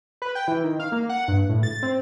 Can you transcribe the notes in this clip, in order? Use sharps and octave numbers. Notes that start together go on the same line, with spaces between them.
B4
G5
E3
D#3
F5
A#3
F#5
G2
A2
A6
C4